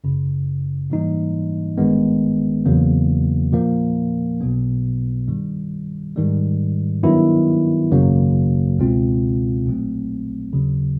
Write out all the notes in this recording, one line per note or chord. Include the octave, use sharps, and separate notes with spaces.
G#1 F#2 C#3
G#2 E3 G3 A#3 D#4
G#1 G2 D#3 G#3 B3
E2 C#3 F#3 A#3
A#2 F3 A#3
B1 B2 F#3 B3
G2 D#3 G3
G#2 D#3 G3
G2 D#3 F#3 B3 E4
G#1 F#2 C#3 F#3 A#3
C#2 B2 G#3 C4 F4
A#1 A#2 F#3 A3 C4
D#2 C#3 F#3